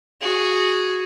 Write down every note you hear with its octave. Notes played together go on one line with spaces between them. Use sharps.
F#4 G#4